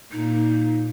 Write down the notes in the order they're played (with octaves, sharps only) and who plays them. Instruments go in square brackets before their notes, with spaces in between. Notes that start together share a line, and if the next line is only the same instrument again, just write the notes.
[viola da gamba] A#2 A#3 [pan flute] D#4